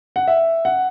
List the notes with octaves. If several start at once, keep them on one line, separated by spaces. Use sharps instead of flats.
F#5
E5
F#5